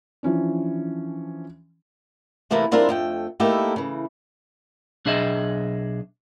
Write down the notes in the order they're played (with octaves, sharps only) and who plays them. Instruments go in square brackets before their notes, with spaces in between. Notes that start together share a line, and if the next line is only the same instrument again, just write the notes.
[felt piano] E3 F3 C#4 D4
[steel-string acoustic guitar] C3 E3 A3 A#3 E4 A#5
G3 C4 D4 E4 F4 A#4
F2 A3 G5
A3 A#3 D#4 E4 G4 A4
C#3 E3
[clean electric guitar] B1 D4 G#4 D#5 E5